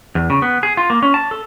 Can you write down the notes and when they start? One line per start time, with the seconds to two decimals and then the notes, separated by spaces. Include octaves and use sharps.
0.15 E2
0.30 C#3
0.42 B3
0.63 G#4
0.77 F4
0.90 A#3
1.03 C#4
1.14 A5
1.31 A4